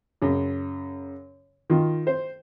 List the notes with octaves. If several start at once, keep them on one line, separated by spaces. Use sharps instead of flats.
F#2 C#3
D#3 F4
C5